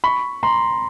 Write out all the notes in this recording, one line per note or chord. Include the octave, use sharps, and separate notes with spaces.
B5 C#6
A#5 C6